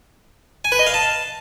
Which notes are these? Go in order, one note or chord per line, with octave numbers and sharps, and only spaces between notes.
G#5
B4
D#5
F5
A5